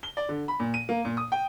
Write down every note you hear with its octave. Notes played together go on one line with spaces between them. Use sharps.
G7
D5
D3
B5
A#2
D#7
A#3
A#2
D#6
G5